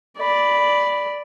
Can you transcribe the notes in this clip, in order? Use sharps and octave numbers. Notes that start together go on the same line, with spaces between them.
D5 B5